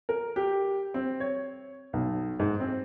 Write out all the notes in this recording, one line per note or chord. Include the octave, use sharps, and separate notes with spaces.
A#4
G4
C4
C#5
B1
G#2
C4